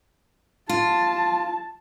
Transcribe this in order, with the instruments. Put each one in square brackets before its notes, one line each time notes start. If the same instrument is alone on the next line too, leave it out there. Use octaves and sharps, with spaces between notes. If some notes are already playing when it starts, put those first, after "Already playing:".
[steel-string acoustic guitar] F4 [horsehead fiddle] A5